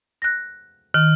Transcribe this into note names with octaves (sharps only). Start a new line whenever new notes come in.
F#6 A#6
D#3 F6